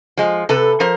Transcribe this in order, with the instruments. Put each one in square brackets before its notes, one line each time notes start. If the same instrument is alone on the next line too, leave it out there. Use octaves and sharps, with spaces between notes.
[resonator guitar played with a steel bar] F3 G#3
C3 A4 B4
F3 A#4 C5